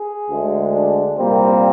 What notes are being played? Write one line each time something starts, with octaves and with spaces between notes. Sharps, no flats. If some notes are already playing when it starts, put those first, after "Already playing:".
Already playing: G#4
D2 D3 G#3
D4
C2 A#2 G3 A#3 C4